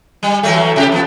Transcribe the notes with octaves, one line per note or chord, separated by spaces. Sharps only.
G3
E3 F#3 A3
C3 F#4 G4
F3 B3